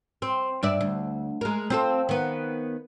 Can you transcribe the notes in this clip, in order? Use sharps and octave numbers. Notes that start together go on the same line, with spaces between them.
C4
G2 D5 E5
D2
G#3 A#4
C4 F4 A4
D#3 B3